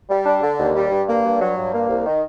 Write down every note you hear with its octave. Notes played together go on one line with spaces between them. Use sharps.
G3
D4
D3
D#2
G3
G2
A#3
G2
F#3
G2
A#3
C2
D#3